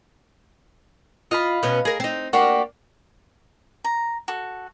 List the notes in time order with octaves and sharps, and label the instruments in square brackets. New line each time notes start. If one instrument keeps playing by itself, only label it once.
[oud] F4 [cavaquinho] D#5 F5 B5
[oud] B2 B3 C#4
G#4 A#4
C4 D#4
[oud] A#3 D4 [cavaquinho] F#4 G4
[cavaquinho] A#5
F#4 A4